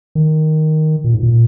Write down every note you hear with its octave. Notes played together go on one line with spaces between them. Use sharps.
D#3
A#2
G#2
A#2